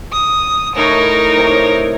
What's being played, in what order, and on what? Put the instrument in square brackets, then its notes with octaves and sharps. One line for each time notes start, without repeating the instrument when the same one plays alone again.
[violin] D#6
[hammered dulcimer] A2 E4 C#6 [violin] D#4 A#4
[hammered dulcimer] C3 C#5